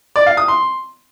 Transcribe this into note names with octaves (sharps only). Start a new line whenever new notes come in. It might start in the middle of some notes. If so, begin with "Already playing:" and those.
D5
F5
D#6
C6